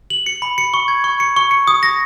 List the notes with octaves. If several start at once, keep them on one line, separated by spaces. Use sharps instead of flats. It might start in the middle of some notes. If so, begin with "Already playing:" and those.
F#7
C#7
B5
C#7
C#6
G#6
C#6
C#7
C#6
C#7
D#6
A#6